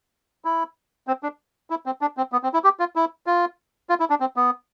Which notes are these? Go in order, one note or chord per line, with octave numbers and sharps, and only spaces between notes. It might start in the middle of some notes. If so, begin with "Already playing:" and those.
E4
C4
D4
E4
C4
D4
C4
B3
C4
E4
G4
F4
E4
F4
F4
E4
D4
C4
B3